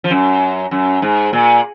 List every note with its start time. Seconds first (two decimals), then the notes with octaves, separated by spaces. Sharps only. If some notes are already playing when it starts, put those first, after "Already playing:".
0.04 F3
0.11 F#2
0.71 F#2
1.02 G#2
1.33 A#2